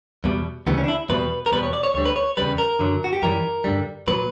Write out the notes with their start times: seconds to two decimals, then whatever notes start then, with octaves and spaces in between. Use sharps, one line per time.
0.24 E2 B2 G3
0.67 D2 C#3 E3 G3 B3
0.78 C#4
0.84 D4
0.88 E4
1.09 E2 B2 G3 B4
1.46 A#4
1.52 E2 B2 G3 B4
1.63 C#5
1.73 D5
1.83 C#5
1.94 D2 D3 G3 C#5
2.05 B4
2.16 C#5
2.37 E2 C#3 G3 B4
2.58 A#4
2.79 F#2 D3 F#3
3.04 F#4
3.13 G4
3.22 F#2 E3 G3 A#4
3.64 G2 D3 G3
4.08 A#2 F#3 B4